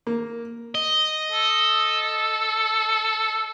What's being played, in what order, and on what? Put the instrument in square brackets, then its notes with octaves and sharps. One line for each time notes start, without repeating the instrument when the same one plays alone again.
[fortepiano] A#3
[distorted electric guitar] D#5
[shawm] A4